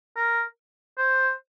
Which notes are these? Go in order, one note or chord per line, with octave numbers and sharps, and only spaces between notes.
A#4
C5